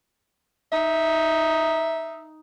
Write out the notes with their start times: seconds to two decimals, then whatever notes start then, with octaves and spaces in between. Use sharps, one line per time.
0.72 D#4 E5